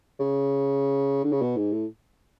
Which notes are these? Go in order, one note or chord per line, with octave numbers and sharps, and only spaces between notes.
C#3
D3
C#3
B2
G#2
A2